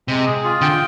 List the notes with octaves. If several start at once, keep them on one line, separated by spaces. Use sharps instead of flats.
C3 G#3
G#4
F4
D3 G5